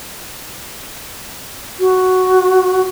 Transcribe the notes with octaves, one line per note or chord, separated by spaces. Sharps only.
F#4